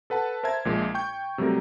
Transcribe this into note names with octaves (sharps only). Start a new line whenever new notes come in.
A4 B4 F#5 A5
A#4 C5 E5 A5 G#6
A#1 A#2 G#3
G5 C#6 G6
C3 F#3 G3 A3 A#4